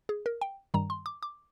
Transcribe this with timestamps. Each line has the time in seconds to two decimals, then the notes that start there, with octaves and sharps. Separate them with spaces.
0.09 G#4
0.26 A#4
0.41 G5
0.74 G2 D#3 G3 A#5
0.90 C6
1.06 D6
1.23 D6